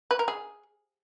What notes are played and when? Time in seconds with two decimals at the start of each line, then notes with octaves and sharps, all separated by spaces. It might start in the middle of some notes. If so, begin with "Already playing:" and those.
0.11 B4
0.19 A#4
0.28 G#4